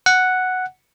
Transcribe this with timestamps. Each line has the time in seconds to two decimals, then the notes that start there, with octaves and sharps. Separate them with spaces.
0.06 F#5